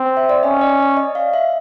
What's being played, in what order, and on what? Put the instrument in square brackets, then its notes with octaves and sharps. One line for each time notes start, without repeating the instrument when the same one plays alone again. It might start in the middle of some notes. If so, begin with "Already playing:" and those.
Already playing: [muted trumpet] C4
[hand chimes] E5
D5
[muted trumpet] C#4 [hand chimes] D#5
[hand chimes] D5
D5
D#5
F5
E5